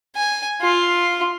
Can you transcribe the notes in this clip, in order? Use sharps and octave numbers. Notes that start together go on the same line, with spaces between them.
G#5
F4